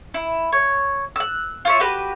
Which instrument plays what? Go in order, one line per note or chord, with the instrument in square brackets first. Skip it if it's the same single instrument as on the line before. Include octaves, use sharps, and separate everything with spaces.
[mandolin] E4
C#5
E6 F#6
F4 C#5 E5
F#4 G4 B4